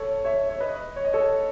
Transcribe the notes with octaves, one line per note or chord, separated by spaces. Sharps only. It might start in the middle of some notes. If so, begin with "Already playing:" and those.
Already playing: A4 C#5
C#5 E5
C#5
B4 D#5
C#5
D#5
A4 C#5